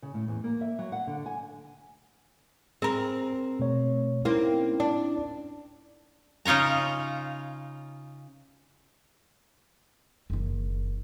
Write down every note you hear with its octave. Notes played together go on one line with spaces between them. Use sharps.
C#3
A2
E2
A#3
E5
F#3
F#5
D3
G#5
C4 G#4 A#4
B2 A3 C#5
A#3 C4 C#4 D#4 E4
D4
C#3 D#4 F4 C#5 A#5
F#1 D#3